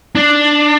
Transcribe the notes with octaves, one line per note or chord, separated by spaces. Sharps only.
D4